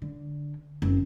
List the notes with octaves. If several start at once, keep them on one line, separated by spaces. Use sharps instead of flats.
D3
F#1 C4